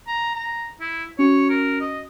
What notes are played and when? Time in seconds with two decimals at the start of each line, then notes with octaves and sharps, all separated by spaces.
0.07 A#5
0.35 A#5
0.80 E4
1.19 C#4 F#4 C#5
1.49 A#4
1.81 D#5